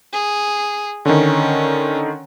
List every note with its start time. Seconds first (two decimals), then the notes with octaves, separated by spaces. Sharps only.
0.13 G#4
1.05 D3 D#3 C#4